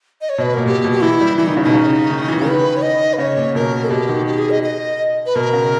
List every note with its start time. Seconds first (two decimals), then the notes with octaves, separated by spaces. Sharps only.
0.21 D#5
0.29 C#5
0.38 B2
0.42 B4
0.54 A#2 A#4
0.66 A#2 G4
0.84 B2
0.91 G4
1.02 E3 E4
1.21 G3
1.38 E3 E4
1.46 D#3 D#4
1.57 C#3
1.64 B2 D#4
1.74 C#3
2.10 D#3
2.28 E3
2.41 C#3
2.46 D#3 B4
2.77 C#5
2.82 D#5
3.13 B4
3.18 C#3 C#5
3.37 A#2
3.55 B2 A#4
3.90 B2 G4
4.09 D#3
4.26 G4
4.38 G#4
4.50 D#5
4.63 D#5
5.26 B4
5.35 B2 A#4
5.53 C#3